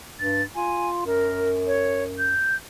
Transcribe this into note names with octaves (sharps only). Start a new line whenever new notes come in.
G2 A6
F4 G#5
F#2 A#4
C#5
G6